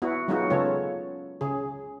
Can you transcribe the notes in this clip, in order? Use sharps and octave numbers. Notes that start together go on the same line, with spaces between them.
B3 E4 F#4
F#3 G#3 B3 D#4 F4 F#4
C#3 B3 F4 A4 C#5
C#3 G#4